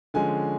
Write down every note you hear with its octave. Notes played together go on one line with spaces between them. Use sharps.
D3 F3 G#3 C#4 G#5